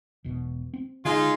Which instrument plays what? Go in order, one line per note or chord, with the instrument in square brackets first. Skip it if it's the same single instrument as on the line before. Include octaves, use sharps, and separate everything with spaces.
[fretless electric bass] E1 B1 B2
C4
[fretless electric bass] D3 [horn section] G#3 D#4 F4